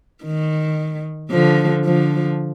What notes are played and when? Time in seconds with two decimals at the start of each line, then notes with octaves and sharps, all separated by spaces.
0.23 D#3
1.31 D3 F3
1.85 D3 F3